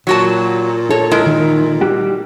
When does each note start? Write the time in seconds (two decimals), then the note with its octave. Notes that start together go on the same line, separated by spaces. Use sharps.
0.07 A#2 F#3 F#4 A5
0.90 A4 C#5
1.11 G#3 E4 A#4
1.26 D#3
1.81 G3 F#4 G4